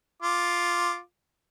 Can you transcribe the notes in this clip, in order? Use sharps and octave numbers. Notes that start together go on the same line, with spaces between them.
F4 D6